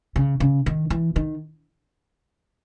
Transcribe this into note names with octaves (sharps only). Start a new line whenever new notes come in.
C#3
C#3
D#3
E3
D#3